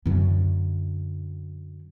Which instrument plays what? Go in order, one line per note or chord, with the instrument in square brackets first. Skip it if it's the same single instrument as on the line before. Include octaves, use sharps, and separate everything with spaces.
[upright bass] F#2 D3